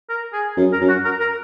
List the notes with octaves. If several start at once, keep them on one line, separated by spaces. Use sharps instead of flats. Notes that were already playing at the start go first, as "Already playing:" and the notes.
A#4
G#4
F#2
A#4
F#2
F#4
A#4
A#4